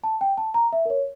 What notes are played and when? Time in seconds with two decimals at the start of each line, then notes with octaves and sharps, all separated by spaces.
0.04 A5
0.21 G5
0.38 A5
0.54 A#5
0.72 E5
0.85 A#4
0.90 C#5